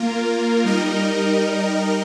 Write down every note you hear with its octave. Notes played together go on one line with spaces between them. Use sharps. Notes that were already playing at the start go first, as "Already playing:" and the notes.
Already playing: A#3 F4 A#4
G3 D#4 A#4 D#5